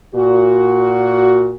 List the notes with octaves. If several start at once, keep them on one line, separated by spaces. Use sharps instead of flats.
A#2 F#4